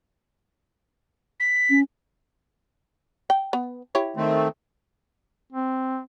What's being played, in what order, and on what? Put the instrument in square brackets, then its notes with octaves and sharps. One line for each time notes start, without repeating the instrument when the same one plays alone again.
[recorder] B6
[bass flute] C#4
[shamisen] G5
B3
E4 G4 C#5
[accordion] D#3 A3 C4
[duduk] C4